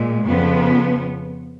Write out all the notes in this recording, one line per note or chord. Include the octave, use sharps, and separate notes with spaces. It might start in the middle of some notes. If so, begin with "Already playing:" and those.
Already playing: A#2 G#3
F2 C#3 F3 B3